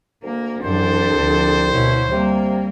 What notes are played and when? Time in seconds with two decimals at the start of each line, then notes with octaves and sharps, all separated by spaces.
0.23 D2 A#3
0.64 C2 F#2 E3 D4 A4 C5
1.17 D2 F3
1.72 D2 B2 E4 C#5
2.11 C3 G3 A#3